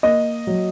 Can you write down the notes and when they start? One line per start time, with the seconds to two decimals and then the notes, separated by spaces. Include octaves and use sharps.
0.03 A#3 D#5
0.47 F#3